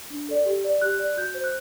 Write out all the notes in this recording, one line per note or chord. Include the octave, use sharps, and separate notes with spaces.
D4
A4 D5
G4
D5
G4 F#6
D5
F#4 G6
C5
F#6